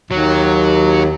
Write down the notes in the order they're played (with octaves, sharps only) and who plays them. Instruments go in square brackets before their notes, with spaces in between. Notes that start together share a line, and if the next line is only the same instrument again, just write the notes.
[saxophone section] D#2 [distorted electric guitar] F#3